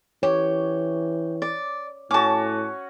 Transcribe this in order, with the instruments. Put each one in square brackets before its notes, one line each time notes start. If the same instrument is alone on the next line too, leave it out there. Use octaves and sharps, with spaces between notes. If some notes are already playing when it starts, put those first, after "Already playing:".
[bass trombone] E3 [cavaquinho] G4 [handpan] C#5
[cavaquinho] D5
[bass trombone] A2 [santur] C#4 F#4 [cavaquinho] A5 D6